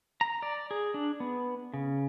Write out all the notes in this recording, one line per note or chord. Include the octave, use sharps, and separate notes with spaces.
A#5
D5
G#4
D4
B3
C#3